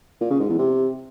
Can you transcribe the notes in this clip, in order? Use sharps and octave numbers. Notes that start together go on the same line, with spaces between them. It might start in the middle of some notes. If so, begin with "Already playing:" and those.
A#2
C#3
G#2
E2
C3